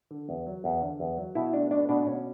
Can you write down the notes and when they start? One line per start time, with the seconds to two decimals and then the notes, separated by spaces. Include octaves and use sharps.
0.11 D3
0.29 E2
0.46 F#3
0.64 E2
0.81 D3
1.00 E2
1.18 F#3
1.35 B2 E4
1.53 A3 D4
1.71 A3 D4
1.89 B2 D4
2.07 B2 C#4